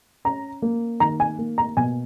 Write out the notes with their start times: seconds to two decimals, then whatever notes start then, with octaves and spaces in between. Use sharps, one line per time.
0.25 C#4 A#5
0.62 A#3
1.00 D#3 A#5
1.20 G#5
1.38 A#3
1.58 A#5
1.77 B2 G#5